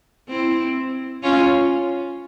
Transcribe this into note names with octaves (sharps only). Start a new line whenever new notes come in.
C4 E4
C#4 F4